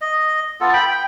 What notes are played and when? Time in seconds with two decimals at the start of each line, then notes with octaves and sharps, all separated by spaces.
0.01 D#5
0.61 B3 F4 A4
0.73 G5 B5
0.91 G5